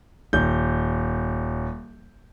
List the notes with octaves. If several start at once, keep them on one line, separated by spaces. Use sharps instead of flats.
D#1 G6